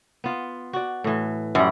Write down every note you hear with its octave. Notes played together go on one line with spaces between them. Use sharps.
B3 F4
F#4 D5
A2 E3
F#2 G3